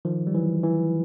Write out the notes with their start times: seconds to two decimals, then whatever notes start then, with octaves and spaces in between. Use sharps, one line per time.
0.05 D#3 F3
0.27 G3
0.34 E3 F#3
0.64 E3